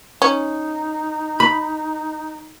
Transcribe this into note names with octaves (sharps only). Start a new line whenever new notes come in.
C#4 D#4
B5